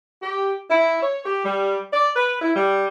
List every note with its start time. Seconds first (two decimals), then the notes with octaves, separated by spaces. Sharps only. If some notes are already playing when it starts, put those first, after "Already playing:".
0.22 G4
0.70 E4
1.01 C#5
1.25 G4
1.44 G3
1.93 D5
2.14 B4
2.41 E4
2.54 G3